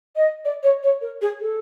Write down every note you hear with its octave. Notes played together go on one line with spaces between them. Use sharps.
D#5
D5
C#5
C#5
A#4
G#4
A4